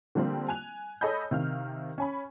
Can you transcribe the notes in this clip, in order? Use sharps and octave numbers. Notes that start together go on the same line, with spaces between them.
D3 F3 G3 A#3 C4
G#5 F#6 F7
A4 C#5 D#5 G#5 B5 G6
C3 D#3 F5 F6
C#4 G#5 B5